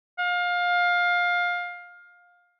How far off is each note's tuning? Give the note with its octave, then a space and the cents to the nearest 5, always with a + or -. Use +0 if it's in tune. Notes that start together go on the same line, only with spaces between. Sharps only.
F5 +20